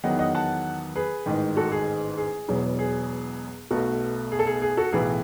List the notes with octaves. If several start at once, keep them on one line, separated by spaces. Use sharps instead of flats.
E2 D#3 F#3 B3 D#5 F#5
D#5 F#5
F#5 A5
G#4 B4
A1 G#2 D#3
F#4 A4
G#4
G#4
E1 E2 B2 F#3
G#4
B1 B2 A3 F#4
G#4
A4
G#4
G#4
F#4 A4
B1 A2 E3 B3 G#4